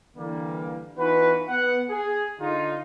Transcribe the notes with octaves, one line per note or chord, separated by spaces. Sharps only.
D3 E3 G3 A#3
E3 B3 D#4 F4 F#4 B4
B3 F#5
G#4
D3 D#4 F4